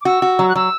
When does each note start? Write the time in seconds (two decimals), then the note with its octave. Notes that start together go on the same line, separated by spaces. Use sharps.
0.01 D6
0.05 F#4 E6
0.22 F#4
0.39 F#3
0.49 F#6
0.55 F#3 E6